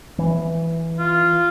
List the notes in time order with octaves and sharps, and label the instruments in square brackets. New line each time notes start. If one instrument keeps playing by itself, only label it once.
[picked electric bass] E3
[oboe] F4